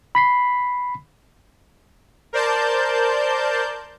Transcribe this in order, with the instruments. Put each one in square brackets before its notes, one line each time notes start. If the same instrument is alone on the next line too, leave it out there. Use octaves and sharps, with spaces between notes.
[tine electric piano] B5 B6 C7
[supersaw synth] A#4 C5 D5 A5 G6